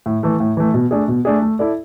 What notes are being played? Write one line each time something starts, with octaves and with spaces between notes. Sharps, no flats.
A2
E3 A3
A2
E3 A3
B2
A3 D4 G#4
B2
A3 D4 G#4
A3
E4 A4 D5